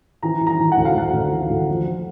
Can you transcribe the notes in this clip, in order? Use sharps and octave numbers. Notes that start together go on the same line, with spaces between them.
E3 A#5
E3
A#5
E3
F#5
D2
F5
D2 F#5
D2
E3
D2
F3